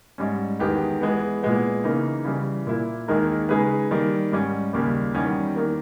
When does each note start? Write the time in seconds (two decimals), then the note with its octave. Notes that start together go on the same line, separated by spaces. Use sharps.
0.18 G#2 G3 C#4
0.60 E2 D#3 G#3 B3 G4
1.01 E3 G#3 B3
1.43 A#2 G#3 B3
1.84 C#3 E3 A#3 D#4
2.25 C#3 E3 G3
2.67 A#2 A#3 E4
3.08 D#2 D#3 G#3 D#4 A#4
3.49 C#3 G#3 D#4 G#4 B4
3.91 D#3 G3 A#3
4.32 G#2 G3 C#4
4.73 D#2 C#3 G3 A#3
5.14 E2 D#3 G3 C#4 G4
5.56 D#3 A#3